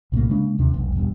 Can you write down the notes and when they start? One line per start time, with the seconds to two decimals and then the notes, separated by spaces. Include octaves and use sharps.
0.12 B1 A2 C3 A#3
0.30 C#3 G#3 A#3 D4
0.59 D#2 C3 D4
0.74 E1 B1
0.96 D#1 E2 G2